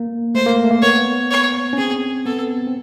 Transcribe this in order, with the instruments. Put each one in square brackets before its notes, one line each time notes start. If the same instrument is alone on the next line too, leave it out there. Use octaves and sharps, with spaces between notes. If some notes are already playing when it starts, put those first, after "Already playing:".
Already playing: [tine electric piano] A#3
[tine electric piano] A3 [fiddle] C5
[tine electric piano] A#3
A3
A#3
[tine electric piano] B3 [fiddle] C#5
[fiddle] C#5
[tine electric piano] C#4
[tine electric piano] C4 [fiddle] G#4
[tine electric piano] B3 [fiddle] A4
[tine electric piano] C4